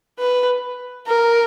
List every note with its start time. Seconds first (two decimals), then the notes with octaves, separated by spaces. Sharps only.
0.19 B4
1.07 A#4